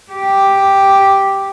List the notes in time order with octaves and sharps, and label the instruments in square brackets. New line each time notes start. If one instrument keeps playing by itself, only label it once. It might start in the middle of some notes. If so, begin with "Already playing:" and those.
[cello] G4